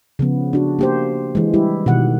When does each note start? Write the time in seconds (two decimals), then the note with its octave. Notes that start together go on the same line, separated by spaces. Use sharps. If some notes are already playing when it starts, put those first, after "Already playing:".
0.19 C#3 F3 B3
0.53 D4 F#4
0.79 A#3 G4 C5
1.35 E3 G#3
1.54 G3 E4 G4
1.86 B2 D#3 F#5